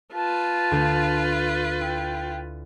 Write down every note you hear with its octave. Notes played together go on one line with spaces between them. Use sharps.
F4 B4 A5
D2 F5 G6
E4 G5